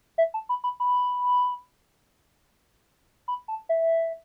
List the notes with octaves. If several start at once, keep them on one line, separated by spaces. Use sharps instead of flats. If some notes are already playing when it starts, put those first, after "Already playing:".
E5
A5
B5
B5
B5
B5
A5
E5